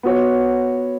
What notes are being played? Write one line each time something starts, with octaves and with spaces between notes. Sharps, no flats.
B3 F#4 C#5